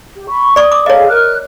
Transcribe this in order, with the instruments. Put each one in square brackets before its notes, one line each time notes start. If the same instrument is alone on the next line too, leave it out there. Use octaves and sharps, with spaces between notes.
[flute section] G4
B5 C#6
[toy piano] D5 C#6 [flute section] D#6
[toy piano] D6
[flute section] G#4 A4 F5 [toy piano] C#5 D#5
[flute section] A#4 F6 F#6